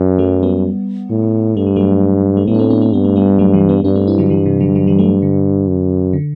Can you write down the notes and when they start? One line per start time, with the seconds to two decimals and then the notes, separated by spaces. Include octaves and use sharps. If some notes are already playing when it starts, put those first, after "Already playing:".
Already playing: F#2
0.19 F#3 A3
0.43 G3 B3
1.10 A2
1.56 G2 A3
1.66 G3
1.76 F#3 A3
2.37 A3
2.47 A2 G3 B3
2.54 D4
2.59 A3 C4
2.70 B3 D4
2.81 A3 C4
2.93 G2 B3
3.04 A3
3.16 G3 B3
3.39 F#3 A3
3.54 E3 G3
3.69 G3 B3
3.84 G2 B3 D4
3.95 A3 C4
4.07 C4 E4
4.18 D3 F#3
4.30 E3 G3
4.46 C3 E3
4.60 D3 F#3
4.75 D3 F#3
4.87 E3 G3
4.99 F#3 A3
5.22 D3
5.67 F#2
6.13 D3